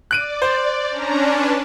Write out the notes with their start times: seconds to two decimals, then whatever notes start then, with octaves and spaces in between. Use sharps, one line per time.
0.11 D5 F#6 D7 D#7
0.42 C5
0.91 C#4 D4 A#5
1.29 B4 A5